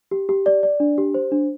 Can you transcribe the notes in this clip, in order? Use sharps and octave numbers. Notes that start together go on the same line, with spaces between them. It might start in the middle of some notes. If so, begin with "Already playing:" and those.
G4
G4
D5
D5
D4
G4
C5
D4